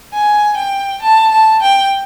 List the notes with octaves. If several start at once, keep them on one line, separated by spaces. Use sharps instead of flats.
G#5
G5
A5
A5
G5